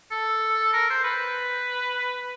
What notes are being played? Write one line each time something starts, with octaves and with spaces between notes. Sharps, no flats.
A4
A#4
C5
B4